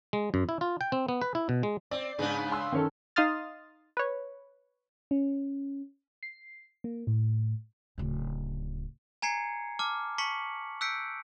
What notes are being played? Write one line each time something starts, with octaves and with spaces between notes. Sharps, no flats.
G#3
F#2
E4
F4
G5
C4
B3
B4
E4
B2
G#3
C4 D5
G#2 C#3 B3 D4
C6 E6
D#3 C#4 A4
D#4 F5 C6 D#6 F6 A6
B4 C#5
C#4
C7
A#3
A2
D1 C#3
G#5 A#5 G#6 C7 C#7
A5 D6 F6
A5 C#6 B6 C#7 F#7
E6 F#6 G6 B6 C#7 D7